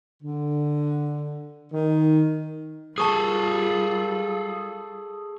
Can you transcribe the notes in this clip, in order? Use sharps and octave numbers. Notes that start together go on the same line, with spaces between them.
D3
D#3
G3 F4 G#4 A4 A5 C#6 D#6